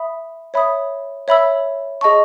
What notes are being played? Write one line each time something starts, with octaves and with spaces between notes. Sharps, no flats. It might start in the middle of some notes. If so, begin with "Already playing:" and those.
Already playing: E5 B5 D#6
C#5 E5 B5 D#6
C#5 E5 B5 E6
G#4 D#5 A5 C#6